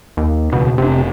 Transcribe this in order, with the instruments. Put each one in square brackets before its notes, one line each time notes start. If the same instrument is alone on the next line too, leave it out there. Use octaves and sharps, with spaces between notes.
[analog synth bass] D#2
[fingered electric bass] E1 C#2 [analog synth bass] B2
[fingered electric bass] F1 D4 [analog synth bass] C3